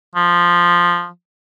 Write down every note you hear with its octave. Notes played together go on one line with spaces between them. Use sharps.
F3